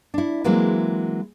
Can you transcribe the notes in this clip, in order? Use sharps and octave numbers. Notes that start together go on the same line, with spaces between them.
D4 E4
E3 F#3 G#3 A#3 C4 E4